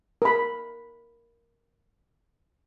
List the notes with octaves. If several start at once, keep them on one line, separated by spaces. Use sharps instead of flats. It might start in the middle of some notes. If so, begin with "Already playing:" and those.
A#4 B5